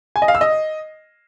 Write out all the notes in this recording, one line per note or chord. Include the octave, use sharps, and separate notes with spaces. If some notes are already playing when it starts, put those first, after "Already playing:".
G#5
D#5
F5
E6
D#5